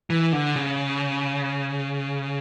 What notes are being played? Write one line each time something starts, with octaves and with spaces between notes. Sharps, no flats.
E3
D3
C#3